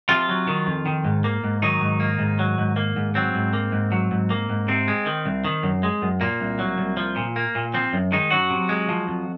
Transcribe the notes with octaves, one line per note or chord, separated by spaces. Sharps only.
C3 F3 F4
F#3
D#3
F2
D#3
G#2
A#3
G#2
D#3 F#3 D#4
G#2
A#3
G#2
F#3
G#2
A#3
G#2
F#3 C4
G#2
A#3
G#2
F#3
G#2
A#3
G#2
C3 C4
G#3
D#3
C2
D#3
F#2
G#3
F#2
A#2 A#3
C2
F#3
C2
F3
A#2
A#3
A#2
F3 C4
F#2
D#3 G#3 D#4
F#2 F#3 F#4
C3
G#3
F3
F2